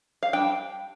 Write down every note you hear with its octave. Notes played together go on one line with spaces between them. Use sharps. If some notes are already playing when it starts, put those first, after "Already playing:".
F5
G3 D4 G5